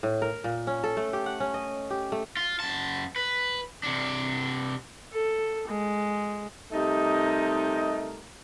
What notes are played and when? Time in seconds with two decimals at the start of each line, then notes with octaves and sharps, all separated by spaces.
0.03 A2
0.22 A#4
0.44 A#2
0.67 C#4
0.84 A4
0.97 A3
1.13 G4
1.26 F#5
1.40 C#4
1.54 D#5
1.90 G4
2.12 A3
2.37 F4
2.60 F#2 A5
3.16 B4
3.83 C3 D4
5.13 A4
5.68 G#3
6.72 C3 G3 A3 D#4 A#4 D#5